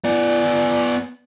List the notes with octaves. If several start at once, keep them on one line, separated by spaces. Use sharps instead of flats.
B3 D5